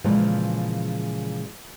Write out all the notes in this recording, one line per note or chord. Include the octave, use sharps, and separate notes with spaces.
A#2 C#3 E3 F3 G#3